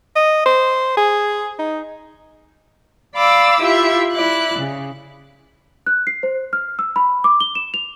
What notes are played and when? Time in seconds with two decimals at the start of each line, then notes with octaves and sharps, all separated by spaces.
0.16 D#5
0.46 C5
0.97 G#4
1.59 D#4
3.16 D5 F5 B5 D6 E6
3.61 E4 F4 G4 E5
4.12 E4 D5 F#6
4.59 C#3
5.87 F#6
6.07 C7
6.23 C5
6.53 F6
6.79 E6
6.96 B5
7.24 D6
7.40 G7
7.55 E7
7.74 F7